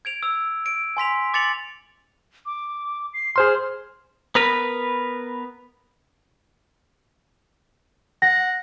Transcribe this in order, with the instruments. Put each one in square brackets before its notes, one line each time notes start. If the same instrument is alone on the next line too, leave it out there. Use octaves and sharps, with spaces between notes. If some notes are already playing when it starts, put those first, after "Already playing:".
[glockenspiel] G#6 D7 F7
E6 F7
D7
G#5 C6 B6 F7
D6 A6 C#7 F7 F#7
[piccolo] D6
C7
[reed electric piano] G#4 C5 C6 [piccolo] F6
[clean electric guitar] B3 A#4 B4
[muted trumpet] F#5 [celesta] A#6